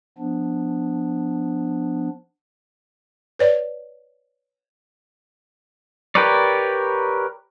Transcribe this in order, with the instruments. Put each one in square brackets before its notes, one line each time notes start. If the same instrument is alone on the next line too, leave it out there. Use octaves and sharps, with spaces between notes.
[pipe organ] F3 B3 D4
[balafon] B4 C#5 D5
[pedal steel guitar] G4 A#4 B4 C#5 D5